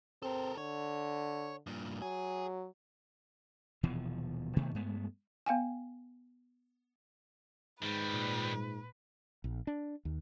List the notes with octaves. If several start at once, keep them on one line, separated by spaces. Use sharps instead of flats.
C4 A4 A#4
D3 C#5
G2 A#2
F#3 G#4
D#1 B2 E3 F3
B2 D#3 A3 B3
G2 G#3 A3 B3
B3 F5 G5 G#5
G#2 D#3 G3 B4
A#2
A#1
D4
D#2